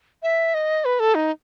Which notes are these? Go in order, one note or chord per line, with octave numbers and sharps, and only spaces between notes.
E5
D#5
B4
A4
D#4